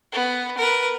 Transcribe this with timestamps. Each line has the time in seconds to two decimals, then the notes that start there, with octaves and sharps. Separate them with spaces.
0.12 B3
0.58 A#4 B4